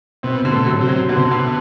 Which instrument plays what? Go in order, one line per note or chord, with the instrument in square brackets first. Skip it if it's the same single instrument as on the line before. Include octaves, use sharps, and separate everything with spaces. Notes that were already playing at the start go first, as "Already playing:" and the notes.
[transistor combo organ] B2 [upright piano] C4
[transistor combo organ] B2 [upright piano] D3
[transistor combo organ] A2
[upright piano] F#3
[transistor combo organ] C3
[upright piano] F#3
[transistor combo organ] B2 [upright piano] D3
[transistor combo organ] C3
B2
[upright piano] D3